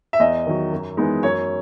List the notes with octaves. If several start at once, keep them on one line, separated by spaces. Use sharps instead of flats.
E5
E2 D#5
D#3 F#3
F#2
E3 G#3 B3 D#4
F#2 C#5